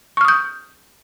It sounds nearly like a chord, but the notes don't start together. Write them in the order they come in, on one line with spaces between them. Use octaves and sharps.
C#6 F6 D#6 G6